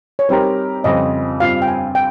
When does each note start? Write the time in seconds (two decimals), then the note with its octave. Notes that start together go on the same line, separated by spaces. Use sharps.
0.19 C#5
0.29 G3 C4 D#4 G4 A#4 C5
0.84 F2 C#3 G3 C4 D#5
1.40 G2 G3 C4 F4 F5
1.62 G5
1.67 G#5
1.95 G5